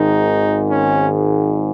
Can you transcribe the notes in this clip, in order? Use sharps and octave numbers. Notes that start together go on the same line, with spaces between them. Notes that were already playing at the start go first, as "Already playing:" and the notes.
Already playing: G#1 G#2 D#3 D#4
C#4